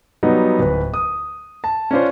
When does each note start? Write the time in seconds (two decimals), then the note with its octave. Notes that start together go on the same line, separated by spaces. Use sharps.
0.23 F#3 G3 B3 D#4
0.59 D1 B4
0.94 D#6
1.64 A5
1.91 C#4 D4 F4 C5